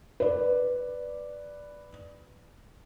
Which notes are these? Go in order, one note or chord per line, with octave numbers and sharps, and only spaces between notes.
B4 D5